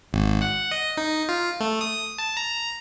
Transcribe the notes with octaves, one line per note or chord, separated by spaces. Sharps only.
G#1
F#5
D#5
D#4
F4
A3
D#6
A5
A#5